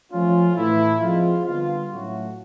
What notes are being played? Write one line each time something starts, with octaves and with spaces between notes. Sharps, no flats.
F3 A3 C#4 F4
A2 E3 A3 E4
F3 G#3 C4 F4
D3 G3 B3 D4 F4
A2 F#3 A3 C#4 F#4